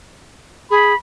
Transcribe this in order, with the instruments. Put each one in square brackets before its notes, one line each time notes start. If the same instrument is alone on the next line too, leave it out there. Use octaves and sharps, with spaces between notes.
[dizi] G#4 [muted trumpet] B5